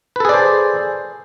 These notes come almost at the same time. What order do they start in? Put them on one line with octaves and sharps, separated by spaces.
B4 A4 G#4 D5 C5